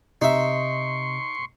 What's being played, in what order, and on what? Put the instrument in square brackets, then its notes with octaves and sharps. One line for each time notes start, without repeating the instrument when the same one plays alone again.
[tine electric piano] C3 [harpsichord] D#4 E5 [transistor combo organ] C6 C#6